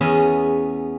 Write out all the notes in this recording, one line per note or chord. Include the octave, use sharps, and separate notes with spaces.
E2 B3 C#4 G#4 E5 G#5